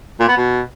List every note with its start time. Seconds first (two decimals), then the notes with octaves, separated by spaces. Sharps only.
0.20 A#2
0.28 B3
0.37 B2